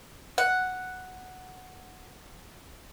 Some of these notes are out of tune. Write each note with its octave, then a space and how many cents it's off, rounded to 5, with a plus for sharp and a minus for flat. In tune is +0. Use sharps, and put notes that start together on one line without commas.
F#5 +0